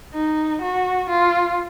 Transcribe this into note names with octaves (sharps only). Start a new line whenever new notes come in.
D#4
F#4
F4